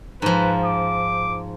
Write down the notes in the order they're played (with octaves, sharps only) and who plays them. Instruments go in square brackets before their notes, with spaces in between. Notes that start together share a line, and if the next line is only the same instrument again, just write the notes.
[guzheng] G#2 F3 [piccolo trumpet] B4
[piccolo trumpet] D6